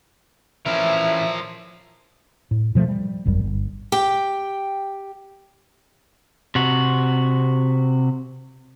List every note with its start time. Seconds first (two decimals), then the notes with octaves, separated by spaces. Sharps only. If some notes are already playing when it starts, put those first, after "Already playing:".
0.66 E3 F3 C#4 E4 A#4 E5
2.51 A2
2.75 B2 F3 G3 A3
2.88 G3
3.25 D#1 G#1 F#2 G3
3.41 G1
3.92 G4 G5
6.55 C3 F#4